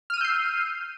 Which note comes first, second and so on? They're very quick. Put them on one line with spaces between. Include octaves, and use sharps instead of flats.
F6 D#7 E6 G6 C7